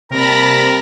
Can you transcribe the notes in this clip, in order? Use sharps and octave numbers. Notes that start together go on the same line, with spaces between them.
C3 G3 A#3 C4 A#4 A5 B5 A#6